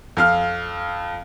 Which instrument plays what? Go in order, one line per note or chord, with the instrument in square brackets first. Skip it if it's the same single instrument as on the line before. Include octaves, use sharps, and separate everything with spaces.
[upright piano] F2 F5 F6